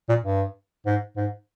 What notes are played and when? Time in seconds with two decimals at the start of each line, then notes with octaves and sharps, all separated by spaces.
0.09 A#2
0.24 G2
0.86 G#2
1.17 G#2